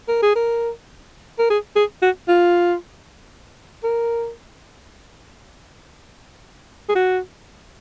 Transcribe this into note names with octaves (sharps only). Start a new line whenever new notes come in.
A#4
G#4
A#4
A#4
G#4
G#4
F#4
F4
A#4
G#4
F#4